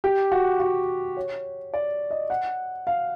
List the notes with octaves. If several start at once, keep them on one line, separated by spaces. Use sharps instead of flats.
G4
F#4
F#4
C#5
D5
D#5
F#5
F5